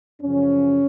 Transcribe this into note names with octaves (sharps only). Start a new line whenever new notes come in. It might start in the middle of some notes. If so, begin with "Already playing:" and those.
F#2 C#3 F3 C#4